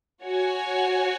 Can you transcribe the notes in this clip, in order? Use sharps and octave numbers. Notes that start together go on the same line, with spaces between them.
F#4 C#5 G#5